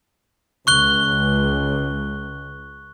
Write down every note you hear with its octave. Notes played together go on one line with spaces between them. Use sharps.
C#2 C#6 F#6 G7